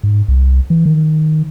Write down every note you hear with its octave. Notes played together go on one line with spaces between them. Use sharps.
G#2
C2
E3
D#3